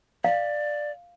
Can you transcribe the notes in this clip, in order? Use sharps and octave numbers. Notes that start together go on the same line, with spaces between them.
D5 F5